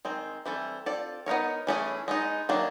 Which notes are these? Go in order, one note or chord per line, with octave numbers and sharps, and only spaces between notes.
D#3 G#3 C4
E3 G3 C4 E4 A4
C4 F4 A4 D5
B3 D#4 F#4 A#4 C#5
E3 A3 C#4 E4 G#4
G#3 B3 D#4
D#3 F#3 A#3 D4